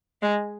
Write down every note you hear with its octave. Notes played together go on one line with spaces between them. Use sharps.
G#3